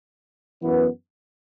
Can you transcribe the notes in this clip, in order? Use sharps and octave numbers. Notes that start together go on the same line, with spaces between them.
F#2 E3 B3